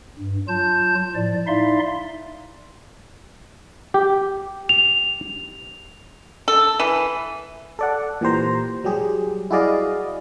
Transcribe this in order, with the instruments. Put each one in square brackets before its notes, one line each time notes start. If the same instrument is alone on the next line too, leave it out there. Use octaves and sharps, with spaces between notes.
[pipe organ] G2
F#3 F4 A5 G6
A2 F3 D5
D#4 E4 D5 E5 F5 C6
[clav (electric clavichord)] G4
[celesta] F7
[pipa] A4
E3
[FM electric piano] A4 D5 F#5
A#2 E3 G4 C5 A#5
F#3 G3 G4 G#4
E4 F#4 G#4 D5 D#5 F5